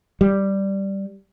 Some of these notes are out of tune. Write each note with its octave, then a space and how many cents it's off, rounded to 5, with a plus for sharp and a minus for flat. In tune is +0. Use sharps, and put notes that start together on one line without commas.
G3 -5